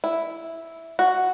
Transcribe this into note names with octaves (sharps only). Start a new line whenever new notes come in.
E4
F#4